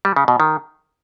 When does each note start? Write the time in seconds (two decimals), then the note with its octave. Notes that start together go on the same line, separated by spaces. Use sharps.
0.05 G3
0.16 C#3
0.28 B2
0.40 D#3